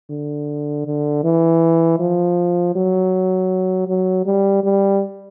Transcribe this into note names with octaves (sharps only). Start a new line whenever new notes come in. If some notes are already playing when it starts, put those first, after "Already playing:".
D3
D3
E3
F3
F#3
F#3
G3
G3